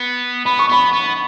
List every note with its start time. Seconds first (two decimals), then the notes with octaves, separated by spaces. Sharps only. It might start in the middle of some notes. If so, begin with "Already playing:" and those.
Already playing: B3
0.45 B3 B5
0.59 C#6
0.69 B3 B5
0.93 B3